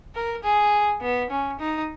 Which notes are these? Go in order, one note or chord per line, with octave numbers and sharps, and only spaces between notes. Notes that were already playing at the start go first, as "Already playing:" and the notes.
A#4
G#4
B3
C#4
D#4